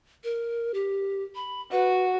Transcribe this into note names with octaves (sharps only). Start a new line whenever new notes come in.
A#4
G4
B5
F#4 B4